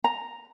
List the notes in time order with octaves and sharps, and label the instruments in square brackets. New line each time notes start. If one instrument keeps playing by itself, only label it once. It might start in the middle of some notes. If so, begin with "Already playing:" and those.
[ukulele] A#5